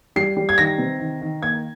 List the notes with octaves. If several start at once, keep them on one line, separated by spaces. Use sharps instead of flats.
G3 C7
G3
G#6
D#3 A#6
C3
D#3
D#3
A#3 G#6